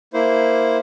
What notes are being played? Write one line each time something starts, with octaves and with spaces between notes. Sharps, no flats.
A#3 E4 C5